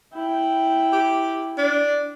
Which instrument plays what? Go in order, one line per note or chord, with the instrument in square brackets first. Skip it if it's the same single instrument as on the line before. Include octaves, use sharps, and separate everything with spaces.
[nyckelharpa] E4 G5
[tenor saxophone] G4
D4